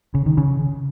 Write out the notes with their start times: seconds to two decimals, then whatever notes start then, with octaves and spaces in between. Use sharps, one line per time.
0.15 C#3
0.26 D#3
0.37 C#3